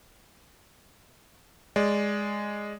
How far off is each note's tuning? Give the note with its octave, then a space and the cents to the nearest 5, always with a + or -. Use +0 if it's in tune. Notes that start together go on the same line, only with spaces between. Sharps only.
G#3 -5 D5 -5